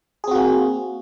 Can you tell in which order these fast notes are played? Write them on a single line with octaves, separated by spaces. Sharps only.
G#4 C4 F#4 A#3